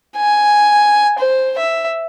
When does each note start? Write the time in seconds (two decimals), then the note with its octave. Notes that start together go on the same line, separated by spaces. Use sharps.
0.18 G#5
1.19 C5
1.58 E5